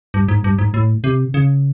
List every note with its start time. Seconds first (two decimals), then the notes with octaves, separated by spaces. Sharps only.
0.14 G2
0.28 G#2
0.44 G2
0.59 G#2
0.74 A2
1.04 C3
1.34 C#3